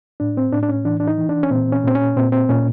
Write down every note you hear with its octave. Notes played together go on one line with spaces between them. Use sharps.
A2 D4
C4
A2 D4
D4
C#4
E3 D4
D4
D#4
E3
D4
C#4
A#2 C4
C#4
A#2 C4
C#4
A#2 C4
C4
A#2 C#4